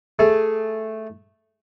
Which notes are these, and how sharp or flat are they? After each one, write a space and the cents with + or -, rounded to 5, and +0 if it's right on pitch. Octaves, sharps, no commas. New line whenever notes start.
A3 +0 G#4 +0